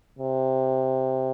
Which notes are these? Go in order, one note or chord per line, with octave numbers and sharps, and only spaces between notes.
C3